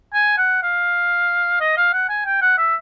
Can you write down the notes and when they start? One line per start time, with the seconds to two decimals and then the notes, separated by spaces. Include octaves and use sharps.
0.14 G#5
0.38 F#5
0.63 F5
1.60 D#5
1.77 F5
1.93 F#5
2.10 G#5
2.26 G5
2.42 F#5
2.58 E5